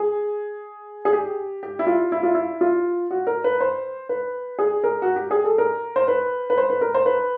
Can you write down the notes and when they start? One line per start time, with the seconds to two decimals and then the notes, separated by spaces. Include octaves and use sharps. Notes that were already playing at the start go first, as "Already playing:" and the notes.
Already playing: G#4
1.05 G#4
1.13 G4
1.63 G4
1.79 E4
1.87 F4
2.12 E4
2.23 F4
2.35 E4
2.61 F4
3.11 F#4
3.27 A#4
3.44 B4
3.61 C5
4.09 B4
4.59 G#4
4.84 A#4
5.02 F#4
5.16 G4
5.31 G#4
5.44 A4
5.58 A#4
5.96 C5
6.08 B4
6.50 B4
6.58 C5
6.70 B4
6.81 A#4
6.94 C5
7.06 B4